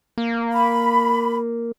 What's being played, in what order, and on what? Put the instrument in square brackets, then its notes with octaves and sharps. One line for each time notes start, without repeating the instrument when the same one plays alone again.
[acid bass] A#3
[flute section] B5